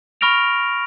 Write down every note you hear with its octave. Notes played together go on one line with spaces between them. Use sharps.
B5 C#6 F6 A#6 D7 F7